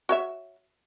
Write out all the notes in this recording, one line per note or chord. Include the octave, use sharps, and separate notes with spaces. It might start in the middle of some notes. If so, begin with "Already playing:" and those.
F#4 C#5 E5